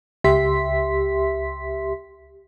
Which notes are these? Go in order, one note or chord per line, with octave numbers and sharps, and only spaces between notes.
C#2 G4 E5 C6 B6